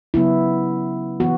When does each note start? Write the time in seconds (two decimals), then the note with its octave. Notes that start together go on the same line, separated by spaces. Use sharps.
0.14 C#3 F#3 B3 E4
1.20 E3 B3 F#4